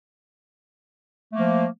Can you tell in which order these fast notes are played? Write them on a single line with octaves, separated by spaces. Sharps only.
A3 A#3 F3